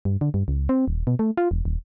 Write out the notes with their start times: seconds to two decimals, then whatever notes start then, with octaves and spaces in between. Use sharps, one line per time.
0.05 G2
0.21 D3
0.34 G2
0.48 C#2
0.69 C4
0.88 D#1
1.07 B2
1.19 A3
1.37 F4
1.51 E1
1.65 D#1